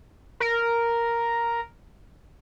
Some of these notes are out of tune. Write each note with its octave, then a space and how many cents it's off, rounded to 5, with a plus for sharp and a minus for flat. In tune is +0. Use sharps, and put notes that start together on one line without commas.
A#4 +0